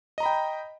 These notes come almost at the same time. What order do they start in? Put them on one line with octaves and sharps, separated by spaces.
D#5 A#5 B5 G5